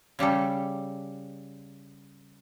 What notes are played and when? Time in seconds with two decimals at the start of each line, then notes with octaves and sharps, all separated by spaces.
0.19 C#3 G3 G4 A4